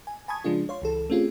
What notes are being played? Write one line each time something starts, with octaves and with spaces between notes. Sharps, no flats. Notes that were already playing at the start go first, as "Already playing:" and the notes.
G#5
G#5 A5 B5 C#6 D#6 G#6
C#3 F3 G#3 D4 F4
C#5 F5 C6
C#2 E3 A4
A3 C4 C#4 F4 G4 G#4